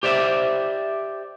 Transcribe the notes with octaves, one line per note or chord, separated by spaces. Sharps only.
G4 C5 D5 E5